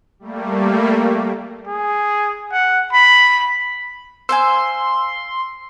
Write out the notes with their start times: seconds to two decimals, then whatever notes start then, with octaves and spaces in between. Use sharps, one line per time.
0.19 G3 A3 A#3
1.67 G#4
2.52 F#5
2.93 B5
4.29 C5 F5 G#5 C6 E6